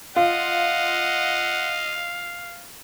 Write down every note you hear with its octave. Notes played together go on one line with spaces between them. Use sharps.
F4 D#5 F5 F#5